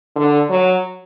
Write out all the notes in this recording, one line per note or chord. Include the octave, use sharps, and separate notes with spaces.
D3
F#3